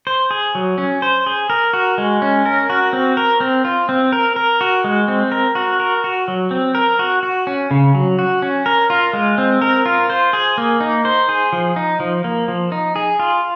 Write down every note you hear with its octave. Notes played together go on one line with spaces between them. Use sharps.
C5
G#4
F#3
C#4
C5
G#4
A#4
F#4
G#3
C#4
A#4
F#4
C4
A#4
C4
F4
C4
A#4
A#4
F#4
G#3
C4
A#4
F#4
A#4
F#4
F#3
C4
A#4
F#4
F#4
C#4
C#3
F#3
F#4
C#4
A#4
F4
G#3
C4
A#4
F4
C5
G#4
A#3
D#4
C5
G#4
F3
D#4
F3
A#3
F3
D#4
G#4
F4